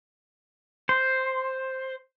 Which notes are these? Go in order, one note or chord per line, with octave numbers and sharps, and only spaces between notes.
C5